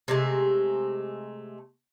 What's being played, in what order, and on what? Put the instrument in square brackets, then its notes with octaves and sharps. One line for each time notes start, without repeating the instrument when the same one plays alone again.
[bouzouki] C3 G#3 A3